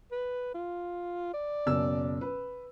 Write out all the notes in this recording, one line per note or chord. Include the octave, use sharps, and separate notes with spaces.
B4
F4
D5
F#1 B2 E6
B4